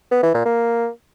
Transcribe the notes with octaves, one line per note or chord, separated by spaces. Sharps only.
B3
E3
A#2
A#3